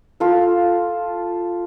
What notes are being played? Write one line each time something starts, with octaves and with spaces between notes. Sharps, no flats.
F4 A4 F5